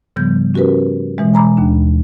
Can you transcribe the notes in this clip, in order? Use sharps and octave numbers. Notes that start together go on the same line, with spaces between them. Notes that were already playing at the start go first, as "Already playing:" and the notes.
G#2 C#3 F3 G3 B3 G6
C#4 F#4 G4 A#4 B4
B2 E3 G#3
G#5 A#5 B5 D6
D#2 D4